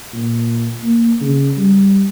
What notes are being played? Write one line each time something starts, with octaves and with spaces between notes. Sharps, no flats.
A#2
A#3
C#3
G3